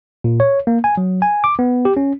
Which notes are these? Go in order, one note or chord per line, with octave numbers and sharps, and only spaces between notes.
A#2
C#5
A#3
G#5
F#3
G#5
D6
B3
G4
C#4